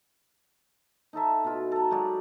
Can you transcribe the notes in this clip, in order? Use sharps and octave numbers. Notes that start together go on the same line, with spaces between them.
D#4 E4 A4 E5
B2 F4
A4 A#5
F#3 G#3 G4 D5